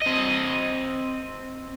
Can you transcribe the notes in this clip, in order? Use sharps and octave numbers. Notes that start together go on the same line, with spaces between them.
C4 D#5